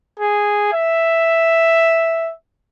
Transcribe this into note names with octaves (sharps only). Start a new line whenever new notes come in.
G#4
E5